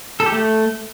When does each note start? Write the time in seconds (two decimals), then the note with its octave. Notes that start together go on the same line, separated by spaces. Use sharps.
0.20 A4
0.26 G4
0.32 A3